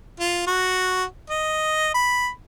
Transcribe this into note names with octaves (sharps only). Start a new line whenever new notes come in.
F4
F#4
D#5
B5